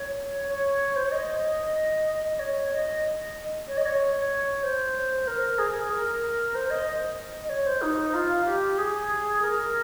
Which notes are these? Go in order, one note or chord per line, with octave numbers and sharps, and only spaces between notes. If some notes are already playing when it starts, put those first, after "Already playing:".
Already playing: C#5
C#5
C5
C#5
D#5
D#5
C#5
D#5
C#5
D#5
C#5
C5
A#4
G#4
A#4
C5
D#5
D#5
C#5
C5
D#4
F4
G4
G#4
A#4